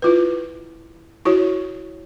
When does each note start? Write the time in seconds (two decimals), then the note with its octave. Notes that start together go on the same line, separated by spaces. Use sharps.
0.02 E4 F4 B4
1.25 E4 F#4 C#5